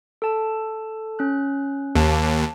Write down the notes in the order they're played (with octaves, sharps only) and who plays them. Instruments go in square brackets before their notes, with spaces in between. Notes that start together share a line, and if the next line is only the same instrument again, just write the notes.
[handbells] A4 A5
C#4 F#6
[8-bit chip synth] D#2 [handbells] A5